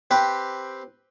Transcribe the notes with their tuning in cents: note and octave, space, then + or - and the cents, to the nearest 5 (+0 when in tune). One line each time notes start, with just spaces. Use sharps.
C4 +0 G4 +0 B4 +0